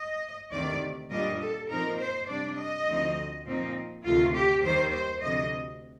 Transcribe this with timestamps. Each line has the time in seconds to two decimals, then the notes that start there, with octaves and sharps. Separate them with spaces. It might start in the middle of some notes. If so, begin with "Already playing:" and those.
Already playing: D#5
0.52 D2 C3 D#3 D5
1.11 A#2 G3 D4 D#5
1.40 A4
1.69 A#2 F3 C4 D#4 A#4
1.99 C5
2.28 C3 G3 D4 D5
2.58 D#5
2.87 D2 D3 F3 C4 D#4
3.45 A#2 F3 C4 D#4
4.05 D2 C3 D#3 A3 F4
4.34 G4
4.63 D#2 D#3 G3 C5
4.93 C5
5.22 D2 C3 F3 D#5